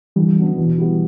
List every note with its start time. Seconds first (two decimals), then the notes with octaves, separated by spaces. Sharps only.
0.16 D3 E3 G3
0.36 F#3 B3 D4
0.57 B2 E3
0.78 G3 B3 E4